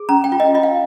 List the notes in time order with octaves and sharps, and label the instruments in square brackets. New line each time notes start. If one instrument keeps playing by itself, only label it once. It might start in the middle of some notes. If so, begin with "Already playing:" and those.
Already playing: [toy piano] G#4
C#4 A#5
G5
F4
D#5
F4 D#5
F5